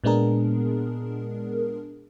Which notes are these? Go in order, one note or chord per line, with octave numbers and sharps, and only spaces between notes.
A#2 G#3 B3 D4 G#4 A#4